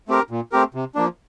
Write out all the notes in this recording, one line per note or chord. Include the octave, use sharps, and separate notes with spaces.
A3 C4 G4 A#4
A#2
A3 C4 G4 A#4
C3
F3 A#3 D4